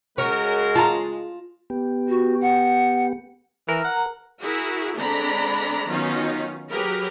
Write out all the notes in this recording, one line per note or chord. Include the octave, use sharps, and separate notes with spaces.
C#3 G#3 C#4 F#4 A#4 C#5
F4 A5 A#5
B3 G4
F#4
F#5
E3 A#4
F#5
E4 F#4 G#4 A#4
D3 G#3 C4 D4 A#5 B5
D#3 F#3 B3 C#4 D#4 F4
F#3 G4 G#4 A#4 B4